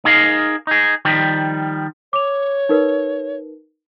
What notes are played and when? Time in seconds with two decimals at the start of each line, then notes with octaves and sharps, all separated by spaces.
0.05 D#4 G#4 A#4 F5
0.67 D#4 G#4
1.05 D#3 F3 G3
2.13 C#5 D6 F7
2.69 D#4 A#4 B4